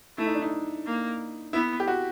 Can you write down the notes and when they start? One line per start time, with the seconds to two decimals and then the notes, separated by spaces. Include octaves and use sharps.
0.18 A3 E4
0.27 D#4
0.35 D4
0.42 D#4
0.86 A#3
1.53 B3 E4
1.80 G4
1.88 F#4